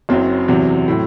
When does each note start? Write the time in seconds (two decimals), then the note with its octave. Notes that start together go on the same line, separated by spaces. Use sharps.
0.09 F#1 F#2 F#3 C4
0.48 E2 C3 F#3
0.88 A2 F#3